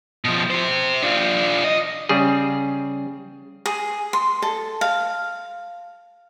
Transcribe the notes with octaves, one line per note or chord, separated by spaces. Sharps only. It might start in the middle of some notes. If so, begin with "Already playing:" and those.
B2 F3
G4 C5
D4 F4
D#5
C#3 G3 G#4
G#4
C6
A4
F5